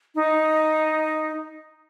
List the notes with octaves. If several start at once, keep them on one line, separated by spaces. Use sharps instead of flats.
D#4